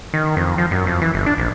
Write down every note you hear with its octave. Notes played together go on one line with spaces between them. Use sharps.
D#3
F2
F3
F#2
F2
E3
G1
D4
A#1